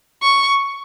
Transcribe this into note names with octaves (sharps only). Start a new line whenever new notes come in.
C#6